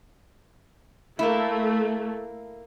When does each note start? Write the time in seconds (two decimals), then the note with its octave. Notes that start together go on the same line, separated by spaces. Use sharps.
1.19 A3 A#3 E4